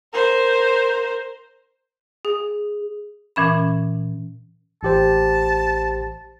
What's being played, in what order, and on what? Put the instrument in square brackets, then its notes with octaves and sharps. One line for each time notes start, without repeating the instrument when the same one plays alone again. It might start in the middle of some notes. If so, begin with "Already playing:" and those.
[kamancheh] A#4 C5
[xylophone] G#4
[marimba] A#2 E3 C#4 B5
[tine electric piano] A1 G4 C5 [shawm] A5